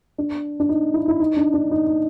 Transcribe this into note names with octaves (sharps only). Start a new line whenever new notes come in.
D4
D4
D#4
E4
E4
D#4
D4
D4
D#4
D#4